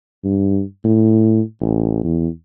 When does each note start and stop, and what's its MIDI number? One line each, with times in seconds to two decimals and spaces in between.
0.24 0.62 43
0.84 1.41 45
1.61 2.01 33
2.04 2.28 40